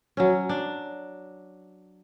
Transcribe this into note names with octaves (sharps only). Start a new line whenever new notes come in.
F#3 C#4
D4